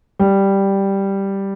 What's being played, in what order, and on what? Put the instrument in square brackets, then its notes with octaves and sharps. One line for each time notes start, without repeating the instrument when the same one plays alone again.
[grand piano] G3